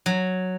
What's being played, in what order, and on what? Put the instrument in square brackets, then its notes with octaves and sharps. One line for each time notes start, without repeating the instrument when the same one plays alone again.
[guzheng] F#3